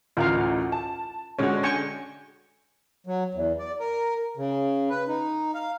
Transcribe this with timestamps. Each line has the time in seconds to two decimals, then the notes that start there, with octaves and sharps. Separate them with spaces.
0.17 A1 D2 F4 A#4 F5
0.72 A5
1.39 D3 G#3 C#4 F#4 C#5
1.63 G5 G#5 C#6
3.07 F#3
3.34 E2
3.59 D5
3.80 A#4
4.37 C#3
4.90 B4
5.08 D#4
5.54 F5